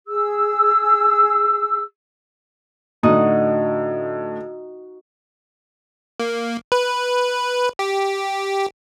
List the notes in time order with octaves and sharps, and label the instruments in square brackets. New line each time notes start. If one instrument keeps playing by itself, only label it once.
[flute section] G#4 E6
[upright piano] A2 D3 [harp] D#4 F#4 D#5
[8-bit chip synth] A#3
B4
G4